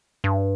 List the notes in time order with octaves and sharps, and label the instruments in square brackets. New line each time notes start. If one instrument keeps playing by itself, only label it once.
[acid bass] G2